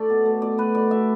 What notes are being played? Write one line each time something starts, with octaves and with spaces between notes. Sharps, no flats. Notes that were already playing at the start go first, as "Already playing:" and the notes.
Already playing: A3 D5
B2
A3
B2 D5
A3 B4
B2 D5
A3 E5